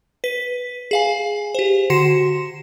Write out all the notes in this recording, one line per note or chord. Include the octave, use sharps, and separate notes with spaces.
B4 B6
G#4 F5 G#5
G4 C5
D3 F#4 C6 C7 C#7 E7